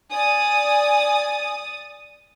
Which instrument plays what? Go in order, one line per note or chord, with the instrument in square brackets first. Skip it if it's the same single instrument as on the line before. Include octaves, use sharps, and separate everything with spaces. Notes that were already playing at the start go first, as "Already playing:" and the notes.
[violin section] D5 D#6 A6 [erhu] G#5